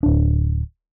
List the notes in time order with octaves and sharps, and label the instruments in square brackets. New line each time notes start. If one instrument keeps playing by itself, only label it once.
[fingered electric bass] D1 D4